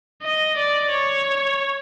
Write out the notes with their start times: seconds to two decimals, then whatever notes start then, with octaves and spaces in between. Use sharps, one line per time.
0.22 D#5
0.57 D5
0.91 C#5